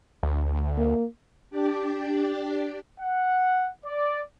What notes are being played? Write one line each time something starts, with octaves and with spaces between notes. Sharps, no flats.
D2
A#3
D4 G4 D5
F#5
D5